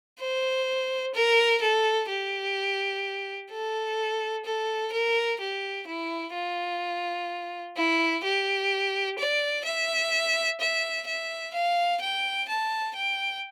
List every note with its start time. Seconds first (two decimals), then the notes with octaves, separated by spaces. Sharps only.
0.20 C5
1.14 A#4
1.61 A4
2.09 G4
3.51 A4
4.45 A4
4.92 A#4
5.40 G4
5.87 E4
6.34 F4
7.77 E4
8.24 G4
9.18 D5
9.65 E5
10.60 E5
11.07 E5
11.54 F5
12.01 G5
12.48 A5
12.95 G5